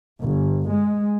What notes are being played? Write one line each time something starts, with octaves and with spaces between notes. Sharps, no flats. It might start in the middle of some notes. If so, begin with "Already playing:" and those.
G1
G#3